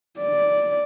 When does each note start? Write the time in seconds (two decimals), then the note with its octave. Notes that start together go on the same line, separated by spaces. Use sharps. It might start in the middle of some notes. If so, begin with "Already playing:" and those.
0.19 D5